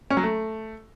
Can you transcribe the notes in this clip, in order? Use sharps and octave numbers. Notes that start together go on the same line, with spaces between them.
C#4
F#3
A3